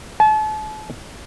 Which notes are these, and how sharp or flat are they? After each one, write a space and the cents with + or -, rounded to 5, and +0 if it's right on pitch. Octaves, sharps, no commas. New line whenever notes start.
A5 -35